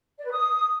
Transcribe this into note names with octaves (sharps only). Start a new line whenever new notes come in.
D5
B4
D#6